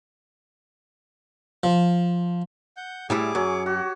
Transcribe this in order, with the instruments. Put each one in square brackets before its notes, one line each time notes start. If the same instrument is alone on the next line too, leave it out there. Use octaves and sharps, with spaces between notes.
[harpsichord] F3
[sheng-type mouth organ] F#5 G6
[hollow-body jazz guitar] A2 G3 E4 [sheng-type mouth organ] G#4 D6
[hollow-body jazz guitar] F#2 [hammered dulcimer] C#5
[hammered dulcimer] F#4 [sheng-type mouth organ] G4